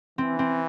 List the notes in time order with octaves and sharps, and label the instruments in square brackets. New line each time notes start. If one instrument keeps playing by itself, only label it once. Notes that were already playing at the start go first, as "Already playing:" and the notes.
[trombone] E3 [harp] C4
[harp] C4